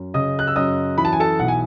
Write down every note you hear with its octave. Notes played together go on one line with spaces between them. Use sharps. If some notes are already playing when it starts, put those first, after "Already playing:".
Already playing: F#2
C#3 D#5 D#6
F#6
E6
F#2 D#5 D#6
E3 B5
A5
G#5
A4 A5
B1 F#5
G#5